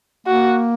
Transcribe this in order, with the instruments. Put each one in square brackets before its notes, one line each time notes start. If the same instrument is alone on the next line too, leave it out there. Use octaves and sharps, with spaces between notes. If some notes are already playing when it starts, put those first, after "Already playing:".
[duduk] A#3 [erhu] F#4